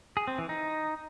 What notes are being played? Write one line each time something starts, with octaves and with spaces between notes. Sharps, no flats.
G#4
C4
E3
D#4